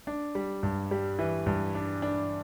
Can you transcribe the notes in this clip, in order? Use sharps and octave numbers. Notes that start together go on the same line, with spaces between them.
D4
G3
G2
G3
E3
G2
D4
D4